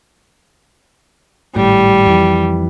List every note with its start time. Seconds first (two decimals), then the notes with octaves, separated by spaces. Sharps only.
1.56 G#1 A2 G3
2.06 F2 E3